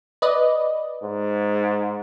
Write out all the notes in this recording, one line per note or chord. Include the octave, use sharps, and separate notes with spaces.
B4 D5 D#5
G#2